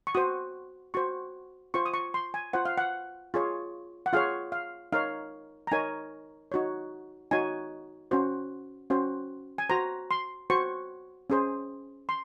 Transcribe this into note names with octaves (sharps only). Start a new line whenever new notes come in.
C#6
F#4 C5 D#6
F#4 C5 C#6
F4 C5 C#6
D#6
C#6
C6
G#5
F4 C5 F#5
F5
F#5
F4 G#4 C#5
F#5
F4 G#4 C#5 F5
F5
D#4 A#4 C#5 F5
A#5
D#4 A#4 C#5 G#5
D#4 F#4 C#5
D#4 F#4 C#5 G#5
C#4 F#4 C5
C#4 F#4 C5
G#5
F#4 C5 A#5
C6
F#4 C5 C#6
C#4 G#4 C5
C6